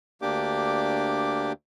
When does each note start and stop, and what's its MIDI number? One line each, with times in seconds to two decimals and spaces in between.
0.22 1.52 38
0.22 1.52 58
0.22 1.52 62
0.22 1.52 67
0.22 1.52 86